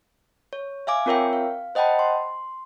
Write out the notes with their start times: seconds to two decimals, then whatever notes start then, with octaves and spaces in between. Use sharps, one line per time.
0.53 C#5
0.87 E5 F5 G#5 D6
1.06 C4 F4 A#4 C#5 E5 G5
1.33 F5
1.75 C5 D#5 F#5 G5 A5 B5
1.99 C6